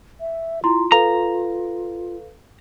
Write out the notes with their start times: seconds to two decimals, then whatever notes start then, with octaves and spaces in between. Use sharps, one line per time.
0.20 E5
0.64 E4 F4 A#5 C6
0.92 A4 B4 F5 A#5